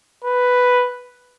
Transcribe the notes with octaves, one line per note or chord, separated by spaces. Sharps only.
B4